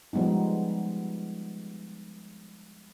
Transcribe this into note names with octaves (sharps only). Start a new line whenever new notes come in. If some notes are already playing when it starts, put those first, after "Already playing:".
F3 G3 G#3 B3 D#4